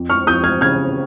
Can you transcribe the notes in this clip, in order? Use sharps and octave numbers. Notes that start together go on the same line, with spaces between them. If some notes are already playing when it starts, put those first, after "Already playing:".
Already playing: F2
C#6 F6
F2 D#6 G6
F6 G#6
C#3 F6 G#6